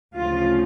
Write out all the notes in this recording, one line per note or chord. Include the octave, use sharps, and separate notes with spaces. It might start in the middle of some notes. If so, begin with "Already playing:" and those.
D2 C#3 F3 F4